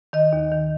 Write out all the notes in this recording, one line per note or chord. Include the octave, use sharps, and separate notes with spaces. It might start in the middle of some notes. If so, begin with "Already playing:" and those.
D#3 D#5
D#2
D#3